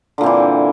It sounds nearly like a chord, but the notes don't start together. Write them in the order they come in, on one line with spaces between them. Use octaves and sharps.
D3 A#2 C4 E3